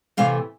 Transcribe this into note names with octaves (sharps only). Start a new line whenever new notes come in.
C3 E3 A3 F5